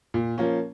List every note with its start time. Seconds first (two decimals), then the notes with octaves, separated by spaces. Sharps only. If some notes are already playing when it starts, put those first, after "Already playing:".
0.14 A#2
0.38 F3 A#3 C#4